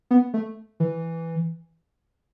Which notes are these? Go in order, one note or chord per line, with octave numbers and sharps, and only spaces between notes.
B3
A3
E3